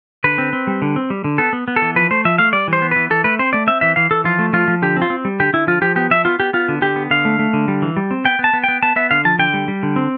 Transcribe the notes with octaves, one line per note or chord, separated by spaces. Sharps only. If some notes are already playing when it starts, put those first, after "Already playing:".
D3 B4
C4
C4
G3
D3
C4
G3
D3
B3 A4
B3
B3
A4
E3
F3 B4
A3 C5
F3 E5
A3 F5
G3 D5
E3
C5
B3
E3 B4
E3 A4
A3 B4
C4 C5
A3 D5
C4 E5
E3 E5
E3 F5
E3 A4
F3 F4
A3
F3 F4
F3
D3 G4
C4
F4
C4
G3
D3 G4
D3 E4
F3 F4
F3 G4
B3 G4
F3 E5
B3 F4
B3 G4
B3 F4
D3
D3 G4
B3
D3 F5
A3
A3
D3
G3
E3
G3
C4
B3 G5
B3
A5
B3
B3 G5
B3 A5
B3 E5
D3 F5
F3 A5
D3 G5
G3
G3
D3
C4